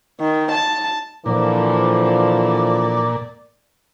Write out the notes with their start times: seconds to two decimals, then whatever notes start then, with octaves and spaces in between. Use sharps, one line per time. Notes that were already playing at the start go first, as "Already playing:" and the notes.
0.20 D#3
0.51 A5
1.26 A#2 D3 E3 F3 D5